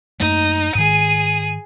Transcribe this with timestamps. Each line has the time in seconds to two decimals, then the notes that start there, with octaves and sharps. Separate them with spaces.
0.20 F#2 A3 A#3 D#4
0.75 G#2 D#3 G#4 D#7